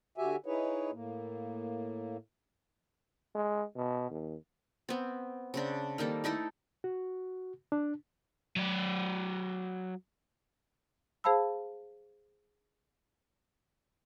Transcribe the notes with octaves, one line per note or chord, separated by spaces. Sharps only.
D3 F#4 G4 E5 G#5
D#4 E4 G#4 B4 C#5
A2 A#3
G#3
B2
D#2
B3 C4
C#3 C4 D4
D#3 G3 A#3 A4
A3 D#4 E4 A4
F#4
D4
F#3 D5
G#4 C5 F5 A5 B5 E6